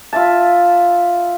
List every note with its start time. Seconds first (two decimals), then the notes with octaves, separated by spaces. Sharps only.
0.13 F4 E5 A5